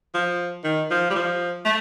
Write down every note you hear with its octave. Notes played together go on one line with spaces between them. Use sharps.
F3
D#3
F3
G3
F3
A3